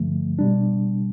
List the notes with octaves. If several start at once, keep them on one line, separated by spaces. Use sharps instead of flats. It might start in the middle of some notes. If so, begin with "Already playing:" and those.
Already playing: G2 D3 F3 A3
B2 G3 D4